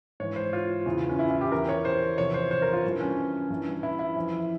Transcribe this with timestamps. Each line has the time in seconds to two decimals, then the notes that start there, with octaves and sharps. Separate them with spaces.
0.20 G#2 E3 C#5
0.36 C5
0.53 F4
0.86 E2 C#3 E3
1.09 C#4
1.19 E4
1.30 E4
1.41 G4
1.52 E2 E3 A#4
1.69 C#5
1.85 C5
2.18 E2 C3 F3 C#5
2.34 C5
2.51 C5
2.62 A#4
2.73 F4
2.84 G2 E3
3.00 C#4
3.50 G2 E3
3.83 E4
3.99 E4
4.16 F2 E3